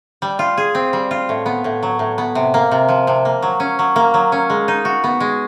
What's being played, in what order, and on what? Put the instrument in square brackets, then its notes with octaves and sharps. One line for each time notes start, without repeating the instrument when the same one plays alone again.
[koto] G3
F4
G#4
C4
G3
F4
A2
B3
A2
F#3
A2
B3
C3
A#3
C3
F3
C3
A#3
F#3
C#4
F#3
A#3
F#3
C#4
G#3
D#4
F#4
B3
G#3